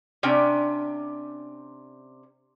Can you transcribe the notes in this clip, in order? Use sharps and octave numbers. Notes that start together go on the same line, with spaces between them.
C3 C#4 D4 G5